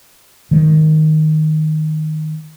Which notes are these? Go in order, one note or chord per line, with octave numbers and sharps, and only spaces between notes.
D#3 G#3